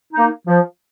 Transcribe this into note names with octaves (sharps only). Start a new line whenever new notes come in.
A#3 D#4
F3